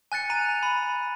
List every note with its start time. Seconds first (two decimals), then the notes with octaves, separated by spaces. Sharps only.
0.12 G#5 F#6 A6 C#7
0.30 A#5 D#7 F7
0.63 B5